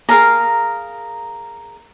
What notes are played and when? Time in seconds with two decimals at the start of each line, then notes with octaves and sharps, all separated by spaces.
0.09 G#4 A#4 F5 A#5